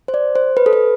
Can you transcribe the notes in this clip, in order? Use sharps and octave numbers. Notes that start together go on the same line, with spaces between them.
C5
D5
C5
B4
A4
B4